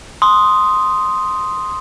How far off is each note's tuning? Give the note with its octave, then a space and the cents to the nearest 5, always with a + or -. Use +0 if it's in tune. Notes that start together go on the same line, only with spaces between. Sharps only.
C6 +0 D#6 +0